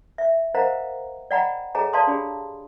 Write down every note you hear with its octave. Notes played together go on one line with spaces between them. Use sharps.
E5
A#4 C5 D#5 F5 F#5 A#5
D5 D#5 F#5 G5 A#5 B5
G#4 A4 C#5 D#5 G#5 A#5
D5 F5 A5 C6 D#6
D4 G4 G#4 D5 B5